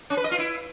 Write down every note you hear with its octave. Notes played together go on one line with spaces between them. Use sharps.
C#4
B4
D#5
F4
E4